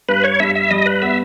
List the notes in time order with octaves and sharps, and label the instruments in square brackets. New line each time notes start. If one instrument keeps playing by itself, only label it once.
[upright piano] G2 [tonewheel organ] B4
[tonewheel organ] C#5
[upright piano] G2 [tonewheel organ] E5
[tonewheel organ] E5
[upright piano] G3 [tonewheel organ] D#5
[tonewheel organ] B4
[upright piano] B3 [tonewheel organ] E5